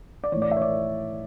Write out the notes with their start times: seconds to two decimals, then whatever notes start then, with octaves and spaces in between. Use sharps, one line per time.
0.24 D5
0.32 E3 C#5
0.36 A2
0.42 D5
0.51 E5
0.57 C#5
0.61 D5